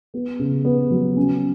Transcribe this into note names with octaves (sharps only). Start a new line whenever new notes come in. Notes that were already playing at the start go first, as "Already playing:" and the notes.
B3
C#3
B3
F#3
C#4